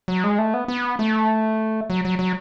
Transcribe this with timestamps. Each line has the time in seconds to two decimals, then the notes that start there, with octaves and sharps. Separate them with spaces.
0.08 F#3
0.24 G#3
0.38 A3
0.54 B3
0.68 B3
0.99 A3
1.90 F#3
2.05 F#3
2.19 F#3